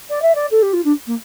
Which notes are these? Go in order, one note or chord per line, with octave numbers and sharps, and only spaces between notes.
D5
E5
D5
A4
G4
F4
D4
A#3